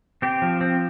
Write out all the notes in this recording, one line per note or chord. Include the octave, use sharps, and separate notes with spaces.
C4 G4
F3
C4